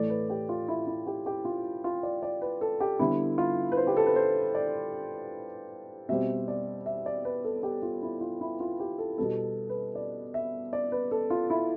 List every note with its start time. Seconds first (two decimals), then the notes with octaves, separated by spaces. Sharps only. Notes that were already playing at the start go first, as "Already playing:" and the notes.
Already playing: A2 E3 A3 D5
0.10 B4
0.30 G4
0.49 F4
0.68 E4
0.87 E4
1.07 G4
1.26 G4
1.45 F4
1.84 F4
2.03 D5
2.23 D5
2.42 B4
2.61 A4
2.80 G4
2.99 D3 G3 B3 E4
3.38 F4
3.72 B4
3.77 C5
3.87 G4
3.97 A4
4.06 B4
4.16 C5
4.55 D5
6.09 B2 G3 C4 E5
6.48 D5
6.86 E5
7.06 D5
7.25 B4
7.45 A4
7.63 G4
7.82 F4
8.02 E4
8.21 F4
8.41 E4
8.60 F4
8.80 G4
8.98 A4
9.18 B2 G3 B3 A4
9.69 B4
9.95 D5
10.34 E5
10.73 D5
10.92 B4
11.11 A4
11.30 F4
11.50 E4